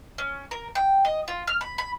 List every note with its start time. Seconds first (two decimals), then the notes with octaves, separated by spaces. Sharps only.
0.18 C#4
0.51 A#4
0.75 G5
1.05 D#5
1.28 F4
1.47 F6
1.61 B5
1.78 B5